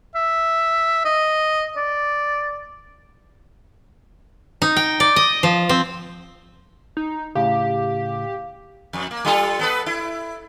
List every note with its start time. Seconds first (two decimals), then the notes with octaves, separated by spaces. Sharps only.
0.15 E5
1.05 D#5
1.77 D5
4.62 D#4
4.76 G5
5.00 D5
5.16 D#5
5.43 F3
5.69 C4
6.97 D#4
7.35 A2 C#3 G4 F5
8.93 F2
9.11 A#3
9.25 G3 F4 A4
9.59 B3 A4 B4
9.86 E4